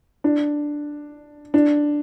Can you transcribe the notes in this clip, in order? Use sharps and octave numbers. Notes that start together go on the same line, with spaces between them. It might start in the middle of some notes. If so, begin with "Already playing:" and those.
D4
D4